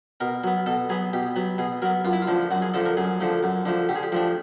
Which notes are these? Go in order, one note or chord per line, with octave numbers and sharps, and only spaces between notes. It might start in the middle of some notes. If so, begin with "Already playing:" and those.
B2 A#4
F#3 B3
B2 A4
F#3 B3 G#4
B2 G4
F#3 B3
B2 G#4
F#3 B3 A#4
F#2 F4
E4
F4
D3 F3 A3
F#2 F#4
G#4
D3 F3 A3 A4
A#4
F#2 G#4
D3 F3 A3
F#2
D3 F3 A3
D3 G4
G#4
G4
F3 A3 D4